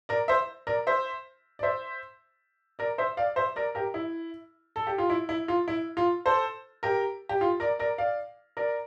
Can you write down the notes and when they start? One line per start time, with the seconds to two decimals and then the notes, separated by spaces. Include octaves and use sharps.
0.09 A#4 D5
0.28 C5 E5
0.67 A#4 D5
0.87 C5 E5
1.59 D5
1.63 C5 E5
2.79 A#4 D5
2.98 C5 E5
3.17 D5 F5
3.36 C5 E5
3.56 A#4 D5
3.75 G4 A#4
3.94 E4
4.76 A4
4.87 G4
4.98 F4
5.10 E4
5.29 E4
5.48 F4
5.68 E4
5.97 F4
6.26 A4 C5
6.83 G4 A#4
7.29 G4
7.41 F4
7.60 A#4 D5
7.79 A#4 D5
7.98 D5 F5
8.57 A#4 D5